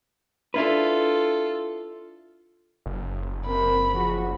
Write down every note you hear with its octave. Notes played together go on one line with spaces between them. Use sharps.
D4 E4 F4 A4 B4
F#1
C3 A#4 B5
F3 F#4 G#4